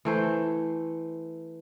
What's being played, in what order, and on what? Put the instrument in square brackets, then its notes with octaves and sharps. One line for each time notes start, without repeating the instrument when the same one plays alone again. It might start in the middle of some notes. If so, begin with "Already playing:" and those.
[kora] E3 A3 C5